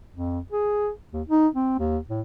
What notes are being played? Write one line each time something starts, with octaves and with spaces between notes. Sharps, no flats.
F2
G#4
D#2
D#4
C4
D#2
A2